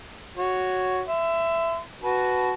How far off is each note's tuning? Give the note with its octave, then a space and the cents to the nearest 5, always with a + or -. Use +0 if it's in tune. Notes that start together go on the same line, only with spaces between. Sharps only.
F#4 +0 C#5 +0
E5 +15 C6 -45
F#4 +0 B4 +0 A5 -25